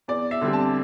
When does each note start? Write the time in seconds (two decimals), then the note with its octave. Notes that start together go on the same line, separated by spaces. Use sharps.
0.08 E2 D5
0.31 E5
0.41 D3 G3 C4
0.53 A5